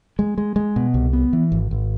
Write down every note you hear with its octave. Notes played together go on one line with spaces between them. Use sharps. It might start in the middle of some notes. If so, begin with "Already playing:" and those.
G#3
G#3
G#3
B2
C2
B3
E3
G#1
G#1